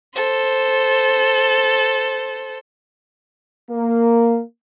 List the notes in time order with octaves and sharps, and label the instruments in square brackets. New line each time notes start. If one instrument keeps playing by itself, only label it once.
[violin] A4 C5
[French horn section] A#3